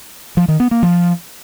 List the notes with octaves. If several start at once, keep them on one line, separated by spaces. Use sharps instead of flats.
F3
D#3
B3
A#3
F3